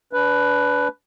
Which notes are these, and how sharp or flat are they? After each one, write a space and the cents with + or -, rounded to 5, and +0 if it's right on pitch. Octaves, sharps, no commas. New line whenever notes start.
D4 -35 B4 +5